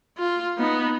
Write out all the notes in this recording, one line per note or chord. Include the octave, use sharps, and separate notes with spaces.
F4
B3 D#4